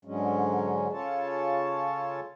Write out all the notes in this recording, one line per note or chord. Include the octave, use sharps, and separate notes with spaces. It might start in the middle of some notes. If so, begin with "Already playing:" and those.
G#2 D3 F#3 G#3 C#4
C#3 C#4 F4 A4 C#5 A5